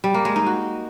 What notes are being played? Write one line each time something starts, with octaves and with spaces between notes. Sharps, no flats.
G3
A#3
G#3
D#4
F#4